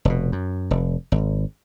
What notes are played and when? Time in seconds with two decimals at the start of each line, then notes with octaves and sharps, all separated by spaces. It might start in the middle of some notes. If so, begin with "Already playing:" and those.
0.05 F1 B2
0.32 F#2
0.71 F1
1.12 G#1